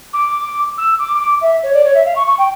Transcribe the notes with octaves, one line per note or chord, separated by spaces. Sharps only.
D6
E6
D6
D6
E5
C#5
D5
C#5
E5
F5
C#6
C#6
G5